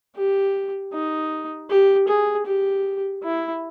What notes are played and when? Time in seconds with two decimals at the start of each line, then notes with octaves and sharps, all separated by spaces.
0.16 G4
0.93 D#4
1.69 G4
2.08 G#4
2.46 G4
3.23 E4